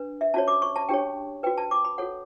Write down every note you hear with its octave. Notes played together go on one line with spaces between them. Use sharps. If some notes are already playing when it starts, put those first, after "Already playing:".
Already playing: D4 B4
E5
C#4 F#4 C#5 A5
D6
C#6
A5
D4 G4 C#5 G5
F#4 B4 G5
A5
D6
B5
F#4 A4 C#5 F#5